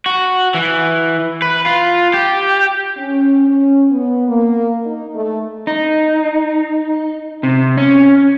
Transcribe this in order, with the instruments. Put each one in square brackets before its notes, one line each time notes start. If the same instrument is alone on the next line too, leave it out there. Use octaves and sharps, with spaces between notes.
[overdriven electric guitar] F#4
E3
B4
F4
G4
[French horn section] C#4
C#4
B3
A#3
D#4
A3
[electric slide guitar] D#4
C3
C#4